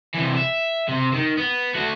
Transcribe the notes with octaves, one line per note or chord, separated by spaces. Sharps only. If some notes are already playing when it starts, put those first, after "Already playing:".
C3 E3
E5
C3
D#3
B3
A3 F#4